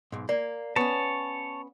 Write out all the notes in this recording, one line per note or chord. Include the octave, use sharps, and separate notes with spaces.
B1 G#2
A#3 D5
B3 C#4 C#5 A5